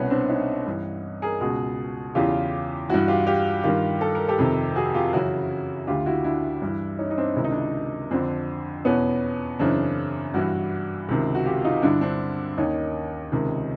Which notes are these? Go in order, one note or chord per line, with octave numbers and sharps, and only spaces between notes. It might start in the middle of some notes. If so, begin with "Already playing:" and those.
Already playing: C2 B2 B3 C#4
C4 D4
C#4 D#4
G2 E3
G#4 A#4
C#2 B2 F#4 G#4
E2 C#3 E3 F4 G4
G2 E3 E4 F#4
F4 G4
F4 G4
G2 D#3 F4 G4
A4
A#4
G4 A4
F2 C3 D#3
F#4 G#4
F4 G4
F#2 C#3 E3 E4 F#4
D2 D3 F4 G4
E4 F#4
D4 E4
G2 E3
C#4 D#4
D#4
C4 D4
C#2 C3 D#3 E4
D#4
D4 E4
F2 D3 C4 D4
E2 B2 B3 C#4
F#2 C#3 E3 C4 D4
G2 E3 E4 F#4
C#2 C3 D#3
F#4
F4 G4
D#4 F4
G2 D3 D4 E4
C4 D4
D#2 D#3 C#4 D#4
C#2 C3 D#3